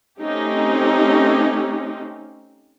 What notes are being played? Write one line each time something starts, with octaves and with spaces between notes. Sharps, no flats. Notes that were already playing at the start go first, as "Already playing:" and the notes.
A3 C4 C#4 D#4 G4